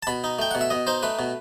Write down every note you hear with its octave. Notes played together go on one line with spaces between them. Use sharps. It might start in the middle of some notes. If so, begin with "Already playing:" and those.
A5
B2 B5
D#4
A3 G5
B2 F#5
E5
B2 D#5
D#4 C5
A3 B4
B2